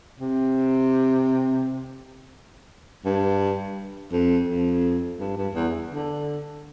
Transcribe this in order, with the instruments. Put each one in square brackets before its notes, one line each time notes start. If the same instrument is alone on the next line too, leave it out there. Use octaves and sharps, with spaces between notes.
[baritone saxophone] C3
G2
F2
F2
G2
G2
E2
D3